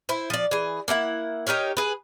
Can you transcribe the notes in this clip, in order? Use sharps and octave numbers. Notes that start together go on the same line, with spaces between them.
E4 C5
F3 D5
E3 G#4
A#3 D4 E4 F#5
D#4 G4 A#4 C#5
G#4 B4